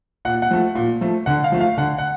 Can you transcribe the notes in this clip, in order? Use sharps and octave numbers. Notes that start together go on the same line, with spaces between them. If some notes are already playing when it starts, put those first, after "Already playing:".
A#2 F#5
F#5
F3 A3
A#2
F3 A3
D3 F#5
F5
F3 A3
F5
D3 F#5
F#5